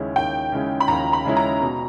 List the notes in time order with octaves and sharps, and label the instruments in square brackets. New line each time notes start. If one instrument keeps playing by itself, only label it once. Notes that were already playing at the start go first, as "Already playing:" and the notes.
Already playing: [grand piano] D#2 C#3 G#3 C#4 E4
[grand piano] D#2 [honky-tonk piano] G5
[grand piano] C#3 G#3 C#4 E4
[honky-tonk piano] B5
[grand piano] D#2 [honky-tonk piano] A#5
[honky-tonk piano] B5
[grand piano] C#3 G#3 C#4 E4
[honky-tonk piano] A#5
[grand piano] B2